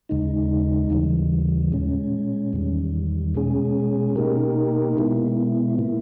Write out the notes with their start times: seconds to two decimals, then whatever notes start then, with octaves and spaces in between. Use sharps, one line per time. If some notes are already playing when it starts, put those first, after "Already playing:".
0.09 D#2 C#3 G#3 D#4
0.90 D#2 C#3 E3 G3
1.72 A#2 G#3 C#4
2.53 E2 D#3 G3
3.34 B2 G#3 C#4 G#4
4.16 B2 A#3 D#4 G4 A#4
4.97 B2 G#3 B3 E4
5.79 A#2 A#3 E4